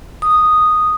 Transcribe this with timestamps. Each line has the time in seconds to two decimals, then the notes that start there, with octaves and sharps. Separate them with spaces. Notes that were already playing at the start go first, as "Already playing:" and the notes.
0.22 D#6